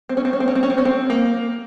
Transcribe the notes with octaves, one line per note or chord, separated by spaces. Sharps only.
C4
C#4
C4
C#4
C4
C#4
C4
C#4
C4
C#4
C4
A#3